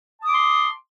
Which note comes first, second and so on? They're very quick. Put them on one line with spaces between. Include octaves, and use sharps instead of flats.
A5 D#6 D6 C6